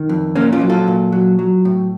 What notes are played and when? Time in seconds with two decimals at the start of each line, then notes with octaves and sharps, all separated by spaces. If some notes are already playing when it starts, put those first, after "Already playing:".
Already playing: D#3
0.09 F2
0.36 A#2 A#3 C#4
0.52 C#4 F4
0.61 F#3
0.70 F4 A4
0.88 A#2
1.12 F#3
1.39 F#3
1.65 A2